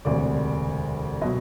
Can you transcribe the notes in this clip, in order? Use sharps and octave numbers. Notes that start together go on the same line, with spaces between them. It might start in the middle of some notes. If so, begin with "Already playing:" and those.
E1 D2 C3 D5
B2 F#3 D#5